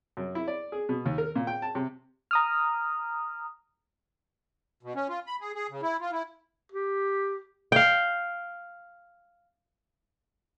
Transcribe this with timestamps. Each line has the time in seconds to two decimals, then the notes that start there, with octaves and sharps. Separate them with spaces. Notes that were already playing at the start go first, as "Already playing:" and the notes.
0.17 F#2
0.35 E4
0.48 D5
0.72 G#4
0.89 B2
1.06 D#2
1.18 A#4
1.35 A#2
1.47 G5
1.62 A5
1.75 C3
2.31 A#5 D#6 F6
4.83 B2
4.95 C#4
5.09 F4
5.27 B5
5.41 G#4
5.55 G#4
5.70 C#3
5.82 E4
6.00 F4
6.12 E4
6.72 G4
7.72 F5 G5